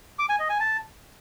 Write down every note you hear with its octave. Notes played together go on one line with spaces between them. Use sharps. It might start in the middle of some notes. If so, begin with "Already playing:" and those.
D6
G#5
D#5
G#5
A5